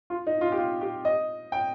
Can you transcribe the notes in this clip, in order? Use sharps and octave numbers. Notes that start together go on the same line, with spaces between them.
F4
D#4
F4
G4
F4
G4
D#5
G5